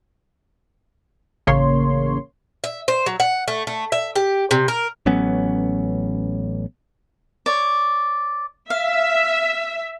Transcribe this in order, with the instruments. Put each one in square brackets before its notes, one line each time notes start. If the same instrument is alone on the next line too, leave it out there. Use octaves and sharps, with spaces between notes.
[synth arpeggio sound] A1 C#3 A#3 C#5 C6
[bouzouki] E5
C5
F#3
F#5
A3
A3
E5
G4
C3
A#4
[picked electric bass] A1 F#3 B3 C#4
[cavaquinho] C#5 D5
[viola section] E5 [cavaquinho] F5